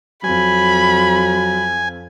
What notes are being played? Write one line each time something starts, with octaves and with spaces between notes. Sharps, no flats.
F2 F#3 G#5 B5